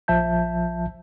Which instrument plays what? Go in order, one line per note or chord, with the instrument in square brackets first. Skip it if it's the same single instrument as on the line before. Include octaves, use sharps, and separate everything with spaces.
[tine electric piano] A#1 F3 E5 A5 G6